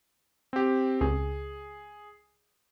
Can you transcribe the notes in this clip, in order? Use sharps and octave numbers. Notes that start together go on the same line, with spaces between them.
C4 G4
C#2 G#4